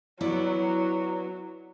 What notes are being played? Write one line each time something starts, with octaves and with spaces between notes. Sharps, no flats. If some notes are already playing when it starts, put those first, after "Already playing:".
F#3 B3 E4 D5